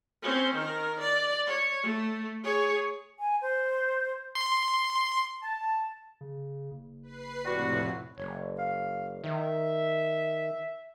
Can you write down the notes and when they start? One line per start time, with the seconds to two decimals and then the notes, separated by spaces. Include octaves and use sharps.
0.22 C4 C#4
0.55 D#3 A#4
1.01 D5
1.46 C#5
1.82 A3
2.44 G#4 C#5
3.19 G#5
3.42 C5
4.35 C6
5.43 A5
6.21 C#3
6.71 F#1
7.03 B4 C7
7.45 F2 A2 C3 G3 E4 F#4
8.18 F#1 C#5
8.59 F5
9.24 D#3 E5